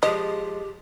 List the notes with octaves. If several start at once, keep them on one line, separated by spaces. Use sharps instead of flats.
F3 G#3 G4 D#5